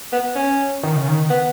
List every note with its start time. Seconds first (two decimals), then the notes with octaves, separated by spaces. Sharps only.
0.13 B3
0.36 C#4
0.83 D#3
0.96 C#3
1.08 D#3
1.30 B3